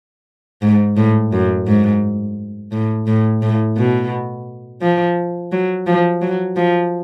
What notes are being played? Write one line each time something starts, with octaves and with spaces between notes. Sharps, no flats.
G#2
A2
F#2
G#2
A2
A2
A2
B2
F3
F#3
F3
F#3
F3